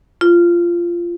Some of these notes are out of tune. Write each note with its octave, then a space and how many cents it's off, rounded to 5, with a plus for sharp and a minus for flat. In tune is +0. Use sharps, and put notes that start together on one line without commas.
F4 -15